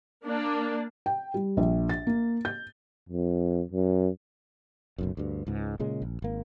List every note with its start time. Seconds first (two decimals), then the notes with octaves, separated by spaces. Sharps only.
0.25 A#3 D4
1.06 G5
1.34 G3
1.57 A#1
1.89 A6
2.07 A#3
2.45 G6
3.09 F2
3.72 F#2
4.98 F#1 B1 F#2
5.17 D2 G2
5.47 C#2 G#2
5.80 A#2 C#3 G#3
6.02 A#1
6.22 G#1 A#3